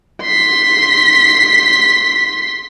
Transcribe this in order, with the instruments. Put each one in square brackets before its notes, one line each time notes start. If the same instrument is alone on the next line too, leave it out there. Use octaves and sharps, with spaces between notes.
[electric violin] C6 B6